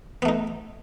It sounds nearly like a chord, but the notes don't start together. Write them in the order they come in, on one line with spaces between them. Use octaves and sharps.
B3 A3 D#4